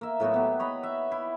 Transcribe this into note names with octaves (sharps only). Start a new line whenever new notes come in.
A#3 E5
A2 F#3 B3 F#4
B3 G4
C#5 D#5 B5
E5
E4